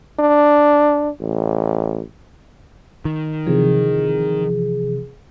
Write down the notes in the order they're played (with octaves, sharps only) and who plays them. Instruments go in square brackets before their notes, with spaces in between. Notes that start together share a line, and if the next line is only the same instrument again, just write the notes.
[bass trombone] D4
A1
[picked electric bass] D#3
[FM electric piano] C3 E3 F3 [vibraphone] G#4